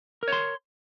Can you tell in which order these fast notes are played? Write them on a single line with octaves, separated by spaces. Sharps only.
A#4 C#5 C6